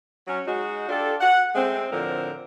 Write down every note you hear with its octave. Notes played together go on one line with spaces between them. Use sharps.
F#3 C#4
G#3 D#4 F#4
D4 F4 G4 A4
F#5
G#3 A3 C4
A2 D3 F3 C4 A#4